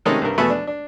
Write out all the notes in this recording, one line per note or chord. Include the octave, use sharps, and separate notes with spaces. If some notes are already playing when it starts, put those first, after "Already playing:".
C3 D#3 G#3 A3 C#4 D#4
C2 G2 A#4
E2 B2 A3 E5 B5 C#6
D4
D4